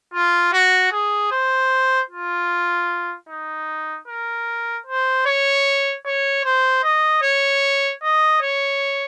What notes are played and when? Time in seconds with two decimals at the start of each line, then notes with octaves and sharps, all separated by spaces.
0.14 F4
0.53 F#4
0.92 G#4
1.31 C5
2.10 F4
3.29 D#4
4.08 A#4
4.86 C5
5.26 C#5
6.05 C#5
6.44 C5
6.83 D#5
7.22 C#5
8.03 D#5
8.42 C#5